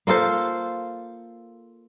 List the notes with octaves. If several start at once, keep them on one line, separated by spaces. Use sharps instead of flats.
A#3 F4 A4 C5